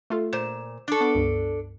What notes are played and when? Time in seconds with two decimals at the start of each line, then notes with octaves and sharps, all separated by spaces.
0.10 A3 F4 A4
0.33 A#2 C5 E7
0.88 D4 A4 D5 C#6
1.01 B3 D6
1.15 C#2 G2